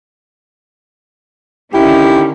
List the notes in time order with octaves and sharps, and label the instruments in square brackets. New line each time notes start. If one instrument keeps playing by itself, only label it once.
[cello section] D3 D#3 C#4 [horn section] E4 G4